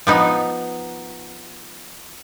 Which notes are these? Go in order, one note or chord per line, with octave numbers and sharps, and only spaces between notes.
F3 B3 D#4